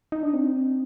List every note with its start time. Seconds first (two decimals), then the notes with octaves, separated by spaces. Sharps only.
0.12 D#4
0.23 D4
0.33 C4